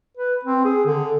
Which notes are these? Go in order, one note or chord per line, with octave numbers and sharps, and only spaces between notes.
B4
C4
G#4
D3